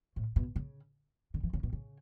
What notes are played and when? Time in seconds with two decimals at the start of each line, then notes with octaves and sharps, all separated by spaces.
0.16 A2
0.36 B2
0.56 C#3
1.34 D3
1.43 E3
1.53 C#3
1.63 B2
1.73 C#3